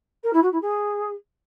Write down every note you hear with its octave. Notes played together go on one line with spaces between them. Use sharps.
A#4
E4
F#4
E4
G#4